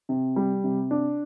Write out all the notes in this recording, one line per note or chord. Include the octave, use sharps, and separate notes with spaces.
C3
G3
C3
D4